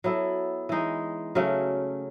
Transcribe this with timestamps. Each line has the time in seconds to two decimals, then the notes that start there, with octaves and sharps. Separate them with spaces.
0.04 F#3 B3 E4 A4
0.69 E3 G#3 D#4
1.35 C#3 F#3 A3 C#4